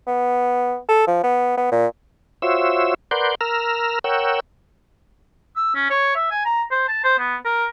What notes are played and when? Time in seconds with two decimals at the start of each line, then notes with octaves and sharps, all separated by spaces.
0.07 B3
0.89 A4
1.07 F3
1.24 B3
1.58 B3
1.71 A#2
2.42 F4 F#4 C5 C#5 E5 E6
3.11 A#4 B4 D5 F#5 C6 G6
3.41 A#4 A#5 E6 F6
4.04 A#4 C#5 F#5 G5 E6
5.56 E6
5.75 C#4
5.90 C#5
6.16 E5
6.31 G#5
6.46 A#5
6.71 C5
6.88 A5
7.04 C5
7.19 B3
7.45 A#4